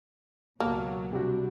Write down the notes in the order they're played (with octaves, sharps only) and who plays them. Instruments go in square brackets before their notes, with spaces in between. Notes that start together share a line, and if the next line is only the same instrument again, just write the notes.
[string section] C#2 B2 F#3 [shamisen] A#3 [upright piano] A5
[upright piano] C3 G3 F#4 [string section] D4